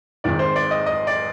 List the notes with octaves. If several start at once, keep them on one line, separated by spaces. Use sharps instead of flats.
G#1 G#2 D#3 D5
C5
D5
D#5
D#5
D5